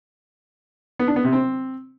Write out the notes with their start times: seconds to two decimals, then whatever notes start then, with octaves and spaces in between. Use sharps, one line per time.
0.99 B3
1.08 D4
1.16 B3
1.24 C3
1.33 C4